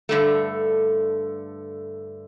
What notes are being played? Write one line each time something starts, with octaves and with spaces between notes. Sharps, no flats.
G2 D3 A3